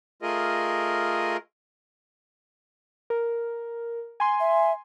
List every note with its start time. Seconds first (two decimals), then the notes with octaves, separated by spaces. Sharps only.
0.22 A3 F4 G#4 A#4 D#5
3.10 A#4
4.20 G#5 C6
4.40 E5